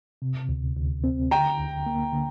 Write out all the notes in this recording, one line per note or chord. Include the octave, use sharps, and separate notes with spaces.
C3
D2
D2
C4
D3 G5 A#5
D2
A#3
D3